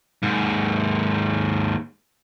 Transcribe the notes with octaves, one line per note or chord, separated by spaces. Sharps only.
D#2 G#2